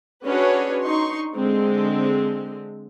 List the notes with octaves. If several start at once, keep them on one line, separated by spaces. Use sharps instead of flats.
C#4 D4 F#4 G#4 B4 C#5
D#4 C6 C#6
D3 G#3 C4